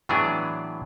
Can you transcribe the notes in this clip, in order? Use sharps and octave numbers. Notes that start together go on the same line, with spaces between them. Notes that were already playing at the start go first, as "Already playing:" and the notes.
A2 E3 F#3 B3 D4 G#4